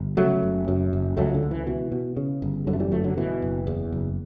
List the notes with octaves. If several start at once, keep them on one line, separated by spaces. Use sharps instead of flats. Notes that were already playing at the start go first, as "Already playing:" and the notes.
Already playing: G1
C#3 F#3 A3
F#1
F#2
F#1
C#2 F#3 A3
D3
C#2
E3
B2 E3
B2
C#3
G1
F#2 D3 F#3
A3
E3 G3
G1 F#3 A3
D3 F#3
B2 E3
F#1
E2
F#1